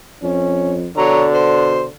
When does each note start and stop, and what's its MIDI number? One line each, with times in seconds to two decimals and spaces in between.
0.23 0.88 41
0.23 0.76 61
0.97 1.85 47
0.97 1.96 50
0.97 1.24 73
0.97 1.24 82
1.34 1.83 72